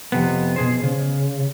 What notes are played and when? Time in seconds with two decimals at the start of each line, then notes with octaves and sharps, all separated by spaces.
0.12 F2 C3 B3
0.56 B2 G#4 C5
0.83 C#3